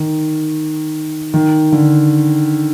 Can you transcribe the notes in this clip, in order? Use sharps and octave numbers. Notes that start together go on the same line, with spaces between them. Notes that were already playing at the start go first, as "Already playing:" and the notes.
Already playing: D#3
D#3
D3